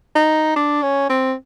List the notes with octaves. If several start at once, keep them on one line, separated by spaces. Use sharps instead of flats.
D#4
D4
C#4
C4